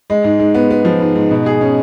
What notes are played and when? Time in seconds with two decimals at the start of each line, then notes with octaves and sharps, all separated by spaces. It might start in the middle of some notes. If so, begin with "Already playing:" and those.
0.10 G#3
0.24 G#2
0.39 G#2
0.55 B3
0.70 B3
0.85 F3
1.01 G#2
1.15 G#2
1.31 B2
1.46 G#4
1.61 C#4